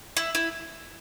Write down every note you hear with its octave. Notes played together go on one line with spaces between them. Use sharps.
E4
E4